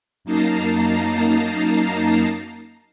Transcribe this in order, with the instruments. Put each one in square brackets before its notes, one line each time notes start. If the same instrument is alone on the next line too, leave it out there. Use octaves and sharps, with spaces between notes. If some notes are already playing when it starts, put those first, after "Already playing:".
[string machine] F#2 A#3 D#4 A5 A#5 C7